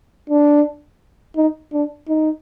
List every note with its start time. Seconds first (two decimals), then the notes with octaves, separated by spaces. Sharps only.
0.30 D4
1.36 D#4
1.73 D4
2.08 D#4